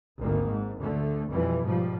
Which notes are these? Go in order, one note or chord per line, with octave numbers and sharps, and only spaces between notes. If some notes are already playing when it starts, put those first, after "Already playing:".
G#1 D2 D#3 A#3
G#2
D2 D3 A3
F2 B2 E3 G3
G#2 F3 G3